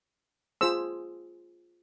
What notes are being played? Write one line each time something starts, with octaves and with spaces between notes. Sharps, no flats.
F4 G#4 C5 E6